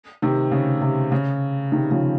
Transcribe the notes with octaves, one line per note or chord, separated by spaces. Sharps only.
C3 D#3
C#3
C3
C#3
C3 D#3
C#3 F3